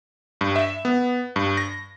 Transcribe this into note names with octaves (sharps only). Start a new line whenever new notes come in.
G2
E5
B3
G2
A#6